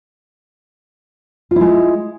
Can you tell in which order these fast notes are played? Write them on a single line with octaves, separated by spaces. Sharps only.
F4 E4 G#3